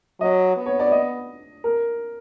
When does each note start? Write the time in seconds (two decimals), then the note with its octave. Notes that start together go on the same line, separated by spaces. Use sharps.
0.21 F#3 D#5
0.57 B3
0.66 C#5
0.79 D5
0.92 D#5
1.64 A#4